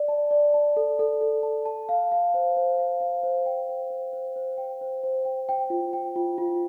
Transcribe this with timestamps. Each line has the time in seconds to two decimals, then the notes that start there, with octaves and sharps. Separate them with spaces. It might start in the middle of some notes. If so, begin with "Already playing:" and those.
Already playing: D5
0.08 A5
0.31 D5
0.54 A5
0.77 A4
0.99 A4
1.21 A4
1.43 A5
1.66 A5
1.89 F5
2.12 F5
2.34 C5
2.57 C5
2.79 F5
3.00 F5
3.23 C5
3.46 G5
3.69 C5
3.90 C5
4.13 C5
4.36 C5
4.58 G5
4.81 C5
5.03 C5
5.25 G5
5.49 G5
5.70 F4
5.93 G5
6.16 F4
6.38 F4